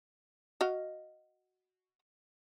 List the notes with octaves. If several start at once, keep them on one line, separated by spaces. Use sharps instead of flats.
F#4 D#5 F5